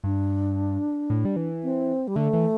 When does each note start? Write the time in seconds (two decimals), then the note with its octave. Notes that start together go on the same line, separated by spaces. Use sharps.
0.04 G2 D4
1.10 A2
1.25 G3
1.36 E3
1.63 C4
2.08 G3
2.16 D3 A3
2.33 E3